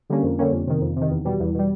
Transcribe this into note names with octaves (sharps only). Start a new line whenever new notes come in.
D3 G3 A#3 C#4
F2
D3 G3 A#3 C#4
F2
C3 D#3
F2
C3 D#3
E2
B2 G3
E2
B2 G3